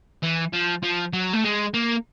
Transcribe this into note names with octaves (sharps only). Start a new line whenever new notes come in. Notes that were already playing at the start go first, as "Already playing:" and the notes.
E3
F3
F3
F#3
A3
G#3
A#3